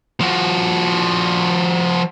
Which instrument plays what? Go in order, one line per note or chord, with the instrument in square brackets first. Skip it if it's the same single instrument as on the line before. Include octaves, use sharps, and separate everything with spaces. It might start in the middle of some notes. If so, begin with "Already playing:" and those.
[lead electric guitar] F3 F#4